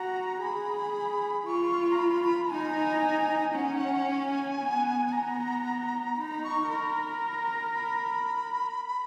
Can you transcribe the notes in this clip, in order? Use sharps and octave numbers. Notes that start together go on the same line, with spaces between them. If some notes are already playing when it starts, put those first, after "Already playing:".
Already playing: F#4 A#5
G#4 B5
F4 C#6
A#5
B5
B5
D#4 G#5
C#4 F#5
G#5
F#5
G#5
B3
B3 A#5
D#4 B5
A#5
B5
C#6
A#4 B5
B5